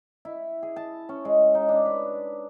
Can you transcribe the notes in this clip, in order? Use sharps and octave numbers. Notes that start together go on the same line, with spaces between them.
E4
G#4
A5
C#4
G#3
D#4
D4
B4